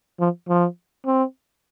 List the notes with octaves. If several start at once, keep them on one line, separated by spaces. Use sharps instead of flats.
F3
F3
C4